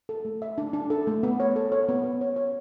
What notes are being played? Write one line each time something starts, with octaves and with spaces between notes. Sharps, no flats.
A4
A3
E5
D4
D4
A4
A3
B3
C#5
A4
C#5
B3
B3
C#5
C#5